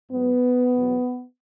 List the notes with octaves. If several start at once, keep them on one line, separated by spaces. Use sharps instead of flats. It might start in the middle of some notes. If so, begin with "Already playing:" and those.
G#2 F#3 B3
E2 B2 F#3